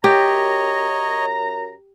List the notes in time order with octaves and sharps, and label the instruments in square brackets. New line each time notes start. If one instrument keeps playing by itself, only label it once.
[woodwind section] F#2 A#5 [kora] G4 [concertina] C#5 D#5